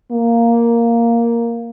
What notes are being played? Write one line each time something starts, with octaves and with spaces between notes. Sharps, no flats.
A#3